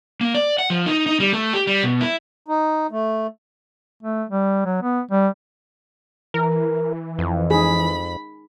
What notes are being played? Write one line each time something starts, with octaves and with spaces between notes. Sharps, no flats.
A#3
D5
F#5
F3
D#4
D#4
G3
A3
G4
G3
B2
E4
D#4
A3
A3
G3
F#3
B3
G3
E3 A#4
F2
D#4 G#4 B5